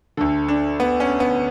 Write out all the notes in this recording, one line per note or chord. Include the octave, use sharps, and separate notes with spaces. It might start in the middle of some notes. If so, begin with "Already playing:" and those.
D2 D3 A4
D4
B3
C#4
B3